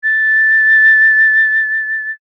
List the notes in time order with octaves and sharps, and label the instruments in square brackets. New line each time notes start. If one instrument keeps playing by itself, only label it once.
[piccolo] A6